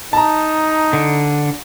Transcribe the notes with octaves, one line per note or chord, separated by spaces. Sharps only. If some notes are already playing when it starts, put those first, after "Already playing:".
D#4 A5 A#5
D3